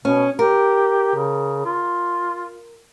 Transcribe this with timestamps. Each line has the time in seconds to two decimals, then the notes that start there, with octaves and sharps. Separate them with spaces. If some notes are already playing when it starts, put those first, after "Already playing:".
0.05 B2 C#4
0.39 G4 A#4
1.16 C#3
1.66 F4